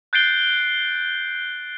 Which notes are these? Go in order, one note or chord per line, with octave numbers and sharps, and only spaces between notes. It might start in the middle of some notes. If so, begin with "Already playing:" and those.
F#6 G6 A6 C7 D7 G7